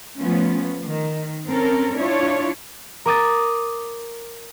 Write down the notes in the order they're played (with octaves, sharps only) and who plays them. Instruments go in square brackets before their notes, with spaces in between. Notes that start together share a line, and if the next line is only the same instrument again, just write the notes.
[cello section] F3 A3 B3 C#4 F4
D#3
C4 C#4 A4 A#4
D4 E4 F4 C#5
[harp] A#4 D6 D#6 A6